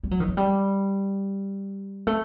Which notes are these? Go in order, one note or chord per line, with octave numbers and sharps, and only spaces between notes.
G3
F#3
D#3
F#3
G3
A3